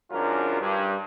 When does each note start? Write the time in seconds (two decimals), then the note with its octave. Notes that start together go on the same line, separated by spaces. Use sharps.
0.11 G#1 F#2 C#4 D4 F4 A#4
0.61 G2